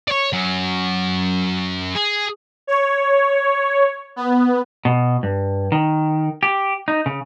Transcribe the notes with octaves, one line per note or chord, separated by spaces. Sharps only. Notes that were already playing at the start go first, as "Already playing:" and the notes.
C#5 D5
F#3 C#4
G#4
C#5
B3
B2
G2
D#3
G4
D#4
C#3